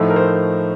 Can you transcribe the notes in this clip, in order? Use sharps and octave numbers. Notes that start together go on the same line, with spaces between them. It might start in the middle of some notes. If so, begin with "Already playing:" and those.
Already playing: A2 F3 A3 D#4
A#4
C5